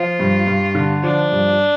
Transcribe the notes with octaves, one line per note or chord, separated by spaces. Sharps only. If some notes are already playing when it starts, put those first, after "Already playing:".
Already playing: F3 F4
G2
G2
D3
F3 D4
G2